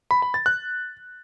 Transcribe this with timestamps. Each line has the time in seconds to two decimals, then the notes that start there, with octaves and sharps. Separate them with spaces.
0.11 B5
0.22 B5
0.34 A6
0.46 F#6